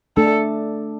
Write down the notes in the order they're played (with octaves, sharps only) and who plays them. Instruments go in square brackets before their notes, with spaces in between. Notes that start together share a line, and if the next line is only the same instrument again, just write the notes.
[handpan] A3 D4 [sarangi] A4